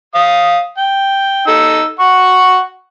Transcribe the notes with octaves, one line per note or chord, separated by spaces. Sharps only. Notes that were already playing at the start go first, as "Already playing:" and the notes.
F5 D#6
G5
D#4 A4 E6
F#5 C#6